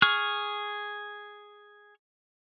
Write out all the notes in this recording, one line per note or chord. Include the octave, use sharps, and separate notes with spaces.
G#4 C#6 F6